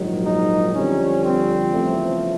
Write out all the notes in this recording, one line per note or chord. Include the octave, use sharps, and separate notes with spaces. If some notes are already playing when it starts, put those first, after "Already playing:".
Already playing: A#1 G#2 D#3 F#3
D#4
F2 D3 G3 C#4
C4
E2 C#3 F3 A3